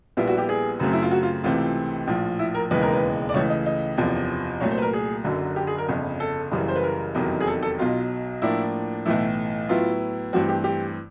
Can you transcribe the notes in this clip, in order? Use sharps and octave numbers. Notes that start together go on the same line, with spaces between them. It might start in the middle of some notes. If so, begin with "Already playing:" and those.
A#1 A#2 G3 B3 E4 F4
F#4
G4
G#4
F#2 C#3 F#3 A3 C4
E4
F4
F#4
F4
C#2 C3 E3 A3 C4 F4
A#1 A2 F3
E4
A#4
E1 D#2 C#3 E3 G#3 B4
A#4
B4
D5
C#2 C#3 E3 A3 C#5
D#5
D#5
F#1 E2 C3 F3
C2 A#2 F#3 A3 C#5
C5
B4
A#4
G#4
F#1 F#2 D3 F#3
G4
G#4
A#4
G1 F2 C#3
A4
F#1 F#2 C#3 E3 G3
C5
B4
A#4
F1 E2 C3 D#3 F#3
G#4
A4
A4
B1 B2 F#3 F4
A2 F3 A#3 D4 E4
B1 A2 E3 A3 E4
A2 F#3 B3 E4 F4
G2 E3 A3 C4 F#4
G4
G4